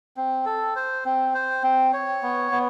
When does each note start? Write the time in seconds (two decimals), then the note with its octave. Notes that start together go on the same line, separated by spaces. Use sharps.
0.17 C4
0.45 A4
0.76 C5
1.05 C4
1.34 C5
1.63 C4
1.93 C#5
2.23 B3
2.52 B3